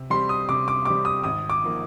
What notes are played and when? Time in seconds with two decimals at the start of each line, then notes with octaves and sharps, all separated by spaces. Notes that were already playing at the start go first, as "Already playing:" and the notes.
Already playing: C3
0.10 G3 C4 G4 C6
0.29 D#6
0.49 C3 D6
0.68 D6
0.85 G3 C4 G4 D6
1.05 D#6
1.23 G#1 D#6
1.49 D6
1.61 G#2 F3 A#3